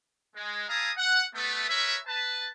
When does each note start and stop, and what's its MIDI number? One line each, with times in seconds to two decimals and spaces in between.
0.35 0.64 56
0.68 0.90 64
0.68 0.90 68
0.68 0.90 77
0.68 0.90 81
0.68 0.90 82
0.68 0.90 87
0.97 1.23 78
1.35 1.66 57
1.35 1.66 59
1.69 1.96 70
1.69 1.96 71
1.69 1.96 73
1.69 1.96 76
2.07 2.48 71
2.07 2.48 81